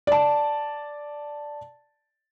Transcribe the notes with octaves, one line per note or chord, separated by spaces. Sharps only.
D5 A5